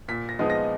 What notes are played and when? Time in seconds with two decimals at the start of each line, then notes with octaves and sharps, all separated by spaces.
0.08 A#2 B6
0.29 A#6
0.39 F3 G#3 B3 D#4
0.50 A#6